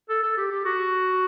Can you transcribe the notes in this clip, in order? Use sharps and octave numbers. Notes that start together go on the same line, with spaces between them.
A4
A4
G4
G4
F#4